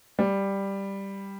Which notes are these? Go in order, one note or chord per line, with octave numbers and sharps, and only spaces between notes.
G3